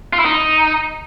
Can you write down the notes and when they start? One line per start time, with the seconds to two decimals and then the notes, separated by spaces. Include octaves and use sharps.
0.13 F4
0.19 E4
0.25 D#4